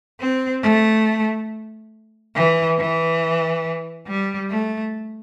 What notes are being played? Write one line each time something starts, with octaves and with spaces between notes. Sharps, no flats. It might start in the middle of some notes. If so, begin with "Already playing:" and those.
C4
A3
E3
E3
G3
A3